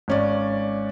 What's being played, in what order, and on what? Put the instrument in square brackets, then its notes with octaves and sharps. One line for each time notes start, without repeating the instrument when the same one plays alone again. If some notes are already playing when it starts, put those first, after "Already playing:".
[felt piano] G#1 C#4 D5